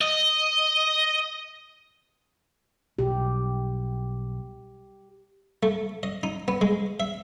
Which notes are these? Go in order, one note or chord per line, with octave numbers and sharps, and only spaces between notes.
D#5
B1 G4
A3
D#5
D#4
B3
G#3
E5